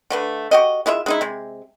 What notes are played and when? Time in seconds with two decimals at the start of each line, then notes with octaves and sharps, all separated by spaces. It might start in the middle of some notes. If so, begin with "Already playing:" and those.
0.10 D3 A3 B4
0.51 F#4 G4 D#5
0.86 G#3 E4 F4 E5
1.06 G#3 D#4 E4
1.21 C3 G#3